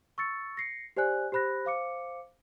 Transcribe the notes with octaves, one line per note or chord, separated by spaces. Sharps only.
C#6 E6 A6 C#7
A#6 C7 C#7
G4 C5 D5 G#5 F#6
G4 C5 B5 F#6 A#6
C5 F5 D6 C#7